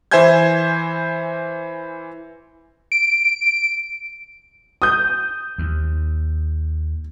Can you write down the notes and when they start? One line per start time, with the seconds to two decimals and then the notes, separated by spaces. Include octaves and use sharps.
0.11 E3 C5 E5 G#5 G6 G#6
2.92 D7
4.82 D#6 G6
5.58 D#2